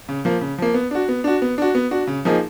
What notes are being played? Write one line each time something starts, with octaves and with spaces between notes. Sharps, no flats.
C#3
F3 A#3
C#3
F3 A#3
B3
D4 F#4
B3
D4 F#4
B3
D4 F#4
B3
D4 F#4
C#3
F3 A#3 D#4 G#4